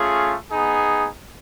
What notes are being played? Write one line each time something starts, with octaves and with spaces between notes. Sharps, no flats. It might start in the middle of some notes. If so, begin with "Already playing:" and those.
Already playing: A3 C#4 F4 G#4
B3 D#4 G#4